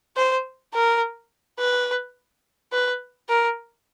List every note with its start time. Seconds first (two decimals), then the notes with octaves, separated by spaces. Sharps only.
0.17 C5
0.73 A#4
1.59 B4
2.72 B4
3.29 A#4